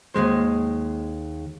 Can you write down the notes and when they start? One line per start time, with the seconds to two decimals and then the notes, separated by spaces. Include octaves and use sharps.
0.14 D#2 G#2 G#3 C5